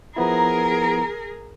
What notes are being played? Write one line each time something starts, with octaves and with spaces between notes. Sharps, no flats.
F3 B3 E4 G#4 A#4 A#5